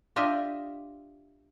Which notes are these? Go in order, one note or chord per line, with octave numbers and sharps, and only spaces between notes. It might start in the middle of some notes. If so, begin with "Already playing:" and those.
D4 F4 G4 D#5 E5